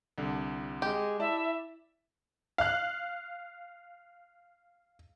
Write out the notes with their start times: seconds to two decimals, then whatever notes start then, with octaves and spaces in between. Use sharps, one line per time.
0.18 C2 D3
0.82 G#3 G4
1.20 E4 D5 E5 A5
2.58 F5 F#6